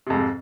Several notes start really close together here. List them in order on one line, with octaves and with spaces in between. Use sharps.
C3 F2 G#2